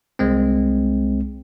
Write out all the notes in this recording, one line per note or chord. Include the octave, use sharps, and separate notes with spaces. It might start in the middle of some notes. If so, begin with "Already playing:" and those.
C2 G#3 C4